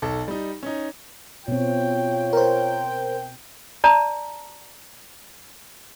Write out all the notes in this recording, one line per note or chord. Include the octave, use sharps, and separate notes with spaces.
B1 A4
G3 D#4
C#4 D#4
B2 C4 F4 C#5 G5
A#4 C5 G5
D5 A5 A#5